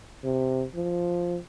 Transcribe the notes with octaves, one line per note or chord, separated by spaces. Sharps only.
C3
F3